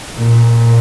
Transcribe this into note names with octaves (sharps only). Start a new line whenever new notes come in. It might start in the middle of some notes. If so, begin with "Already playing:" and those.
A#2